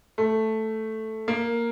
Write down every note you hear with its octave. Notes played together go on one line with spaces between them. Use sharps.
A3
A#3